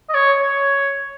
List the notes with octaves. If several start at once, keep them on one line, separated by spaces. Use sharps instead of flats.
D#5
C#5
C#5